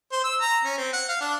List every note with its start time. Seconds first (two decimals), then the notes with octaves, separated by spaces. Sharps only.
0.12 C5
0.24 E6
0.41 A#5
0.65 C#4
0.78 C4
0.93 F#5
1.09 F5
1.21 D4